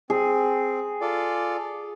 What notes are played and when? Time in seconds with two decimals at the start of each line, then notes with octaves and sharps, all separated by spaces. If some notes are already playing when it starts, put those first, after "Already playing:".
0.10 C4 G#4
1.01 F4 A4 D5